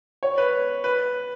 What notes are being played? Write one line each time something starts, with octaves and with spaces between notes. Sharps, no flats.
C#5
B4
B4